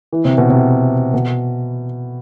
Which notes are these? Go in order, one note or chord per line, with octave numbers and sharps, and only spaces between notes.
E3
C3
B2
C3
B2